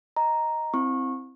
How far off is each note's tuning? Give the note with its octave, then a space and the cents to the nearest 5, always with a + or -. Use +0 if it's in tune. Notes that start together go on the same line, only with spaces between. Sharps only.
D#5 +0 A#5 +0
C4 +0 E4 +0 C#6 -20